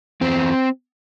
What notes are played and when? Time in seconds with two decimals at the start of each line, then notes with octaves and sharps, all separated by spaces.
0.21 E2 C4